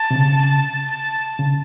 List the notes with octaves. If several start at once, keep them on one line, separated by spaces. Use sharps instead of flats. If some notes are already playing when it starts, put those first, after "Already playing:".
Already playing: A5
C3
C#3
A5
A5
C#3